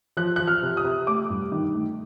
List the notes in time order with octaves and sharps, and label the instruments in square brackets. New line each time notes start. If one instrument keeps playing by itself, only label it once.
[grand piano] F3 F#6
F3 F#6
F6
C3
D#6
C3
A3 D6
G2
D#3
A3